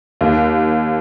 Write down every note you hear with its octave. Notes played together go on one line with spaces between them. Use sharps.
D#2